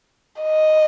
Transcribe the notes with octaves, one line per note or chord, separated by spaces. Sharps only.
D#5